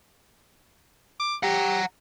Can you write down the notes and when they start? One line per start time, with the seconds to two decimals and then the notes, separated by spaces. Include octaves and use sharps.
1.20 D6
1.43 G4 F#5 A#5